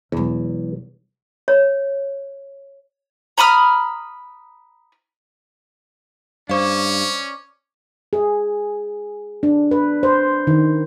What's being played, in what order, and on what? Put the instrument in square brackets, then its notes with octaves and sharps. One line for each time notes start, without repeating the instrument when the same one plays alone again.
[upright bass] E1 F#3 [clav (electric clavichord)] E2
[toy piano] C#5
[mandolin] A#5 B5 D#6 F6
[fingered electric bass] G2 [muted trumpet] C#4 [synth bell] C5 F5 [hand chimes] D5 C#6 D6
[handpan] G#4
D4
B4
C5
D#3